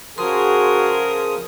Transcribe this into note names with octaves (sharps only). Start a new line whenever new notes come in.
C#3 F3 F#4 G#4 A#4 C6 D#6